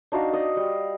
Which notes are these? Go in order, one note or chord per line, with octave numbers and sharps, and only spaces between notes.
D4 D#4 F#4 F5
D5 D#5
G3